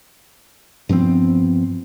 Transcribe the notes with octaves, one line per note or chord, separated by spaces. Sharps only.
G2 F3 B3 C4